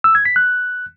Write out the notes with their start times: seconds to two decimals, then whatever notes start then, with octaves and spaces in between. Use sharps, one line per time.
0.04 E6
0.15 G#6
0.25 B6
0.36 F#6